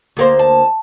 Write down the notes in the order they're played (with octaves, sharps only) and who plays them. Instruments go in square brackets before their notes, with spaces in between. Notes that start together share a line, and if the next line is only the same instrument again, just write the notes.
[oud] D2 A#3 C5
[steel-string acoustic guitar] A5